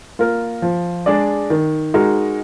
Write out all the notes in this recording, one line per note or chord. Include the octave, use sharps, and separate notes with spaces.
A#3 F4 A#4
F3
G#3 D4 G#4 D5
D#3
G#3 D#4 F#4 A#4